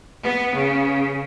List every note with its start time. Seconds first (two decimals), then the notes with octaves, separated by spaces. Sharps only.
0.23 B3
0.54 C#3